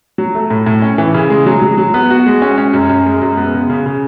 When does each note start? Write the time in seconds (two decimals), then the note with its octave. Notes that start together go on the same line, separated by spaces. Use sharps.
0.18 F#3
0.35 A3
0.50 A2
0.66 A2
0.82 C#4
0.98 E3
1.14 C#3
1.30 G#3
1.46 F#3
1.62 F#3
1.78 F#3
1.94 B3
2.10 F#4
2.26 G#3
2.42 C#4
2.58 C#4
2.74 F#2
2.90 F#2
3.06 G#3
3.22 F#2
3.37 B3
3.54 C#3
3.70 C#3
3.86 C#3